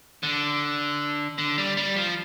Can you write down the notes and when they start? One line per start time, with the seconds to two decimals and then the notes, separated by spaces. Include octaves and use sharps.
0.23 D3
1.38 D3
1.58 G3
1.77 G3
1.96 F3